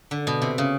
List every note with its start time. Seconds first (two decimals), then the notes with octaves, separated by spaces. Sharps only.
0.11 D3
0.27 B2
0.42 C3
0.58 C#3